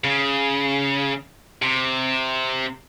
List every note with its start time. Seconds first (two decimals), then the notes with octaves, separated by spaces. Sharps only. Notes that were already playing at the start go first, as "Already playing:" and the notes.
0.04 C#3
1.62 C3